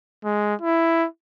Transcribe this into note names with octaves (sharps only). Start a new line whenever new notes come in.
G#3
E4